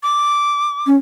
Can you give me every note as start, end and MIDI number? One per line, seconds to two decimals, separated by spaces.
0.03 0.89 86
0.87 0.95 61